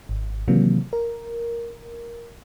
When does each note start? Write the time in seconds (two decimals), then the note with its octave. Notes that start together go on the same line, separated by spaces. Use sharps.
0.09 G#1
0.48 C3 D#3 E3 F#3 A#3
0.93 A#4